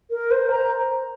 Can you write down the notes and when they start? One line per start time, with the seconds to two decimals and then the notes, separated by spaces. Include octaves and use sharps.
0.11 A#4
0.31 C5
0.51 A#5